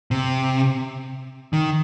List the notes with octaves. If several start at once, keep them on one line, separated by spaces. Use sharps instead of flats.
C3
D#3